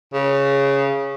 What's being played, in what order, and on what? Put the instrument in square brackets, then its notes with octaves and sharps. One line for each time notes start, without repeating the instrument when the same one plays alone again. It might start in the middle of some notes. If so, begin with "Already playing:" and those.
[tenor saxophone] C#3